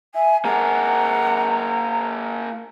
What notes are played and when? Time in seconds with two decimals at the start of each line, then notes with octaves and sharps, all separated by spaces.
0.15 E5 G#5
0.45 A#3 G#4 F#5 A#5